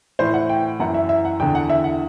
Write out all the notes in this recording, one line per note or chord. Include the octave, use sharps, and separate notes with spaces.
A2 E3 C5
F#5
G5
F#2 E3 F#5
E5
E5
F#5
E2 D3 G5
F#5
E5
F#5